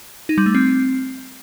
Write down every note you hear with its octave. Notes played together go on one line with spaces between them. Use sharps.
D#4
G3
A3
C4